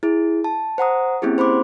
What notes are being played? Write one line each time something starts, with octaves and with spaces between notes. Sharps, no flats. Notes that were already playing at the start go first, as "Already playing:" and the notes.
E4 G#4
A5
C5 F#5 A#5 D#6
A#3 C4 C#4 E4 G4 G#4
C5 B5 C6 D6